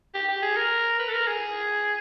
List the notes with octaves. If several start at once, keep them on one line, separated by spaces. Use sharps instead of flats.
G4
G4
G#4
A#4
B4
A4
A#4
G#4